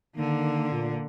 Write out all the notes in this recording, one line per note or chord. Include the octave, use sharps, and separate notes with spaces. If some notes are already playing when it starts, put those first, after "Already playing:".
D3 D#3 A#3
A#2